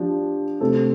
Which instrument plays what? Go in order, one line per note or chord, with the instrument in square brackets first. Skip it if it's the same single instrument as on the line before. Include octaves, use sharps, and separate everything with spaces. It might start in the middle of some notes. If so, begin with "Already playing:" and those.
Already playing: [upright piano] F3 D4 G4
C3 A3 C4 A4